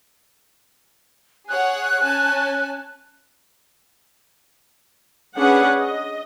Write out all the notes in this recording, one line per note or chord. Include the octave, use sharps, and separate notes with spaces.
G#4 C#5 F#5 F#6
C#4 G#5 A5
C#4 D4 G#4 B4 F#5
D#5